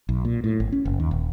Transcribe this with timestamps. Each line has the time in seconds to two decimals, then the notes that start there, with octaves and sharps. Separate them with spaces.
0.09 B1
0.25 A#2
0.44 A2
0.60 G#1
0.72 C#4
0.85 F#1
1.00 D#2
1.11 D#1